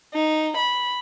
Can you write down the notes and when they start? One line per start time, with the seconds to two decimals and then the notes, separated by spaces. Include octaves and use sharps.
0.14 D#4
0.57 B5